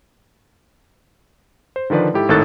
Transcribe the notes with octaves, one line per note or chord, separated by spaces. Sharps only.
C5
D3 D#3 F3 B4 D5
G#2 E4 G4 A4
G#1 A2 D#3 A4 F#6 A6